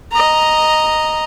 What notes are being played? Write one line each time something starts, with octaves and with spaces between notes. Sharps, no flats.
D#5 A#5